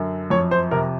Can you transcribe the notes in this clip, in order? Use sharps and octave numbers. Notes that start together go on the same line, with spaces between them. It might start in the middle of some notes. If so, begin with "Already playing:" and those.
Already playing: F#2 D3
F2 C#5
C5
C3 A#4